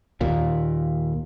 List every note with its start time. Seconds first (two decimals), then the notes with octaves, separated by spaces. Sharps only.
0.21 D#2 A#2